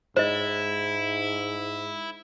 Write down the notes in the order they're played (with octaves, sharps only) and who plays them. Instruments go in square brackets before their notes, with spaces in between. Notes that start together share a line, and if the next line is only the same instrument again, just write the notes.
[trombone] G#2 [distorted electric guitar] E4 [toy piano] C5 D#5